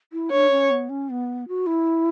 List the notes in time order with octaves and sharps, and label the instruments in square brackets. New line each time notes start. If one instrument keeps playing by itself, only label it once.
[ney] E4
[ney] D4 [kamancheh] C#5
[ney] C#4
B3
C#4
B3
F#4
E4